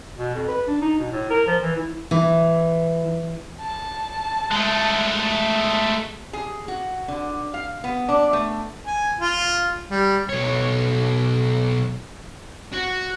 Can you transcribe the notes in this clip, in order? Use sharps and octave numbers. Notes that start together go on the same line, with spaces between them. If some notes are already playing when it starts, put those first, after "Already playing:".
B2
F2
B4
D4
D#4
B2
A2
A#4
F3
E3
E4
E3
A5
G#3 A3
G#4
F#4
D3
F5
B3
D4
A3
G#5
F4
G3
B1 C#5
F#4